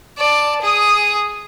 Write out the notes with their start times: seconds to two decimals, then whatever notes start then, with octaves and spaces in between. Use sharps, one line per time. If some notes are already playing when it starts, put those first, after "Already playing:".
0.18 D5 A5
0.62 G#4 D#6